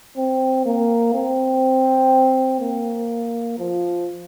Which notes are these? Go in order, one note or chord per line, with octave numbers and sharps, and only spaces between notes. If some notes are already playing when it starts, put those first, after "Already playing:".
C4
A#3
C4
A#3
F3